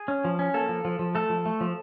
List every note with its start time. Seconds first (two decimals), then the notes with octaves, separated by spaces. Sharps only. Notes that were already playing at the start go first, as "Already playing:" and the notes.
Already playing: G#4
0.08 C#4
0.25 F3
0.39 C#4
0.54 A#3 A4
0.69 F3
0.85 F3
0.99 F3
1.15 A3 A4
1.30 F3
1.45 A3
1.61 F3